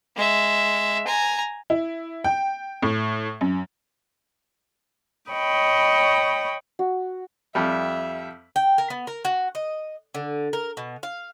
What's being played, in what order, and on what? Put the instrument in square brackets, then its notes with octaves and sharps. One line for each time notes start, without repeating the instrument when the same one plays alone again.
[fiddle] G#3 E5
G#5 A#5
[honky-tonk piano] E4
G5
A2
F#2
[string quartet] C#5 D#5 G5 B5
[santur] F#4
[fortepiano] F2 G3 [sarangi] E5
[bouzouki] G5
A#4
B3
A#4
F#4
D#5
D3
A#4
B2
F5